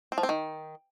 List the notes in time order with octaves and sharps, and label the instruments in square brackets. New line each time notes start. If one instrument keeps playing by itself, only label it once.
[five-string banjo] C4
F3
C4
D#3